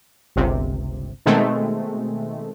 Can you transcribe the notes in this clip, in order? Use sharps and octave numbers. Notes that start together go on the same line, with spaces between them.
G1 C#2 C3
B2 D#3 G#3 A3 C4